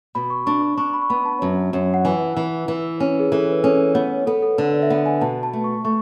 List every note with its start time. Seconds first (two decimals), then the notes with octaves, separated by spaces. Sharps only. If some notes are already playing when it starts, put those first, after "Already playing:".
0.15 B2 B5
0.30 C#6
0.46 D4 C#6
0.62 C#6
0.77 D4 C#6
0.94 B5
1.02 C#6
1.10 B3 B5
1.25 A5
1.42 F#2
1.73 F#2
1.94 F#5
2.05 E3 G#5
2.37 E3
2.68 E3
3.00 C#4
3.19 G#4
3.32 E3 A4
3.52 B4
3.64 C#4 A4
3.94 B3 C#5
4.10 B4
4.27 B3 A4
4.42 A4
4.58 D3 B4
4.74 D5
4.82 E5
4.90 B3 F#5
5.06 G#5
5.21 B2 A5
5.43 A5
5.53 A3
5.64 C#6
5.85 A3 C#6